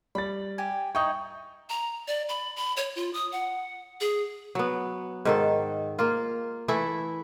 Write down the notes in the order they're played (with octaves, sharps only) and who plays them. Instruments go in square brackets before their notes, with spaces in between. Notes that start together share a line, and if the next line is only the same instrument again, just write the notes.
[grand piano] G3 A6 [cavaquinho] B5
[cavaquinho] G4 G#5
[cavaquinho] D#4 E4 G5 [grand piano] C#6 D#6 G6
[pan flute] A#5
D5
B5
B5
C#5
F4
D#6
F#5
G#4
[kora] F#3 B3
G#2 D#3 A4
A#3 F4
E3 A3 E4 A4